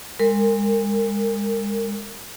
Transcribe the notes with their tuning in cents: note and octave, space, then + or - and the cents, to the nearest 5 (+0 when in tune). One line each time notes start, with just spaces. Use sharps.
G#3 -35 A#4 -30